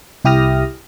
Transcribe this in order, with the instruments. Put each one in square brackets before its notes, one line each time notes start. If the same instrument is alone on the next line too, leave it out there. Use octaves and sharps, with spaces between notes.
[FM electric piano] C2 E4 G4 D#6 F6 A#6